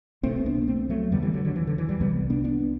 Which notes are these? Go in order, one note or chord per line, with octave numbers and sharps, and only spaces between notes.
C2 B2 A3 C4
B3 D4
B3
A3 C4
F#3 A3
E2 D3 G3 B3
E3 G3
D3 F#3
D3 F#3
E3
D3
E3
E3 G3
C2 C3 G3 B3
B3 D4
B3 D4